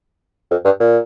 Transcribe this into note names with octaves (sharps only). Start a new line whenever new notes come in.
F2
G2
A#2